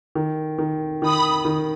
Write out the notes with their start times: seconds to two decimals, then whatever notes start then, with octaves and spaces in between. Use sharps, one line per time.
0.15 D#3
0.58 D#3
1.02 D#3 B5 D#6
1.45 D#3